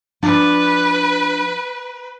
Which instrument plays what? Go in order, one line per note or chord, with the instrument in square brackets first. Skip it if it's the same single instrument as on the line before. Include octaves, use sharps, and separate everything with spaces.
[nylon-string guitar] F3 D4 D5 [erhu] B4